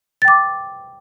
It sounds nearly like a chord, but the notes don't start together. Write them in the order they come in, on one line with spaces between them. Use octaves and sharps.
A6 G5 D6